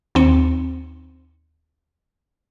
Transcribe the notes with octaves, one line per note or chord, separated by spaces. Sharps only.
D#2 C4 C#7